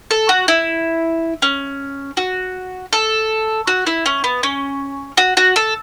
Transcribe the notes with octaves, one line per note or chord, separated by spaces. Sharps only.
A4
F#4
E4
C#4
F#4
A4
F#4
E4
C#4
B3
C#4
F#4
F#4
A4